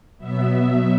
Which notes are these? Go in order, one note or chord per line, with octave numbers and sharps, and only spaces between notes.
B2 F#3 B3 E5